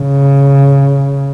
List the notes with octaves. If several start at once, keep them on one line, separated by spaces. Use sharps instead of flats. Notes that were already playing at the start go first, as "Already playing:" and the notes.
Already playing: C#3